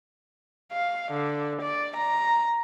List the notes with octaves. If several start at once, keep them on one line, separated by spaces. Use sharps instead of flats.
F5
D3
D5
A#5